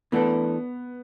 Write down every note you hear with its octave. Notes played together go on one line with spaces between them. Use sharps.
E3 A3 B3 D4 A4